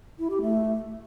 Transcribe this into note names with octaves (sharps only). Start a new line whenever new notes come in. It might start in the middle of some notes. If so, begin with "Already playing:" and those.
E4
G4
A3